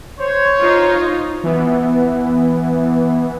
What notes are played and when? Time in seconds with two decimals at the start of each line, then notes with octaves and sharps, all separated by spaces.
0.18 C5 C#5
0.60 D#4 F4
1.43 E3 B3